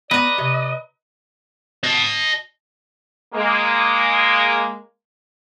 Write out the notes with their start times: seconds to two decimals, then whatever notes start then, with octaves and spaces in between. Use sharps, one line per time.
0.11 B3 B4 D5 D#5 A#5
0.38 C3
1.84 D#5 A5
3.34 G#3 A#3